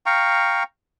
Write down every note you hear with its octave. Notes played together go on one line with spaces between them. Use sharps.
F5 G5 A#5 C#6